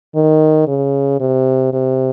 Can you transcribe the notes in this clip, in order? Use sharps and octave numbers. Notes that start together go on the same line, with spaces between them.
D#3
C#3
C3
C3